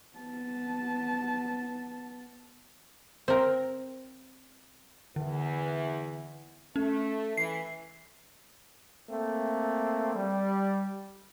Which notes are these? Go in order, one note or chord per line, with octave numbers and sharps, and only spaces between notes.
B3 A5
C4 A#4
E2 D3 E3
A3 C#4
E3 C7
A3 A#3 C4
G3